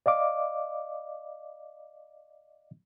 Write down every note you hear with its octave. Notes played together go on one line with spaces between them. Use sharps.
D5 D#5 F5 D6